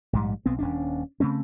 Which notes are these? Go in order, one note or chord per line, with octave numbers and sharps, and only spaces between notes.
A#1 G#2 G3
B1 B3 C4
D#1 C#4 D4
C#3 A3 C4 C#4